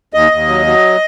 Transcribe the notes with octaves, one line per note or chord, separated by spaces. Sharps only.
D#2 D#5
D#2
F#3
F#3